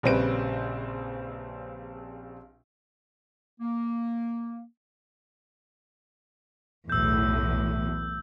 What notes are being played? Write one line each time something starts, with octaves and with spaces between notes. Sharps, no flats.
A#1 C#3 G3 C4 B4 D7
A#3
B1 E2 A2 E6 G6